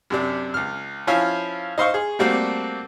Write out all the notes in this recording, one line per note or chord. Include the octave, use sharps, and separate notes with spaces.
F#2 C3 D4
C#2 F6
F3 C#4 E4 F4
D#4 C5 F5 C#6
G#4
G3 A3 A#3 C4 D4 F#4